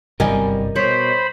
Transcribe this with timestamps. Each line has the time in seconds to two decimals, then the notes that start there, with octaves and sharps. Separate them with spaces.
0.20 G1 C2 F#2 G3 A#4 D#5 G#5
0.76 B2 C5 C#5 B5